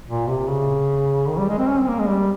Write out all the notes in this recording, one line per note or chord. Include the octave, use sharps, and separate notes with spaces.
A#2
C3
C#3
D#3
G3
G#3
C4
C#4
C4
A#3
G#3
G3